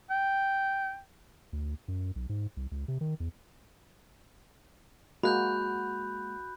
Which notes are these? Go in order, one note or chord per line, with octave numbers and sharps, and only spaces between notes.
G5
D2
F#2
B1
G#2
C2
C#2
C3
D#3
E2
G#3 A#3 F#4 B5 F#6 G6